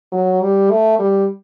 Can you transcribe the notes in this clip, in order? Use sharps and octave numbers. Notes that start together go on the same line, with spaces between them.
F#3
G3
A3
G3